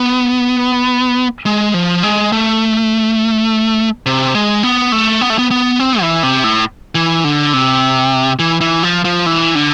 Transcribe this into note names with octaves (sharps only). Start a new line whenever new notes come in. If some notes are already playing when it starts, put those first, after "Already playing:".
Already playing: B3
G#3
F3
G#3
A3
C3
G#3
B3
A3
B3
A3
B3
B3
C4
E3
C3
A2
E3
D3
C3
E3
E3
F3
F3
E3
D3